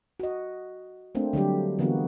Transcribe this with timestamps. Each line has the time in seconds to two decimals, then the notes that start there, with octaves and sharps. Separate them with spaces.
0.20 F#4 D#5
1.15 A3 A#3 C4 D4
1.33 D3 F#3 G3 G4
1.79 D3 E3 G#3 A#3 B3 F#4